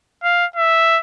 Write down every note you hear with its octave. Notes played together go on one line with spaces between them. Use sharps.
F5
E5